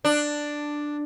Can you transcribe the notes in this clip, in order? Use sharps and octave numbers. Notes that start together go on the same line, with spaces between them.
D4